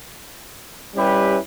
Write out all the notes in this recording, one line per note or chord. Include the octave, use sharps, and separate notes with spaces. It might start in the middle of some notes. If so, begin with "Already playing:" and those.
G3 C#4 E4 G4 B4